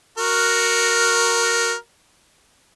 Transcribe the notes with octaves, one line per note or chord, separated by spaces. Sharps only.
F#4 A#4